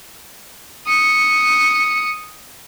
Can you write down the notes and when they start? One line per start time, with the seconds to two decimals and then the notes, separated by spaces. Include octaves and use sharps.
0.87 D#6 C#7